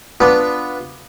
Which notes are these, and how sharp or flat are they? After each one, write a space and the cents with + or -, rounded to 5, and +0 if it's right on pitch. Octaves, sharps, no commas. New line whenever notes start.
B3 +0 D4 +0 F4 +0